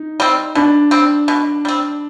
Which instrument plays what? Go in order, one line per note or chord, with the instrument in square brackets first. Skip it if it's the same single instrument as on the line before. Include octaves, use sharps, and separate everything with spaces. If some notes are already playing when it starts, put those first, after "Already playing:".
Already playing: [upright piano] D#4
[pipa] G3 C4
[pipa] B2 [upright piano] D4
[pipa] G3 C4
B2
G3 C4